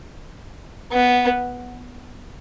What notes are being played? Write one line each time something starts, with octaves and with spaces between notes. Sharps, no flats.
B3